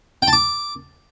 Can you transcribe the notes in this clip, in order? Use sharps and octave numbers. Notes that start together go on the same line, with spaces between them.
G5
A5
D6